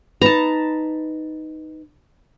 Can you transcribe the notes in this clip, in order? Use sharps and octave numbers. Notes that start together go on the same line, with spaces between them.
D#4 B4 A5 A#5